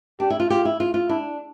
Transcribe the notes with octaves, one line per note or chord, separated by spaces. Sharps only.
D4 G4
E4
F4
F4 G4
E4
F4
F4
D4 E4